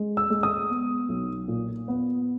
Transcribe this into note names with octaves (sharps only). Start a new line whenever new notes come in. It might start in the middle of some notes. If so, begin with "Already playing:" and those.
Already playing: G#3
E6
G#3
D#6
B3
B1
A#2
B3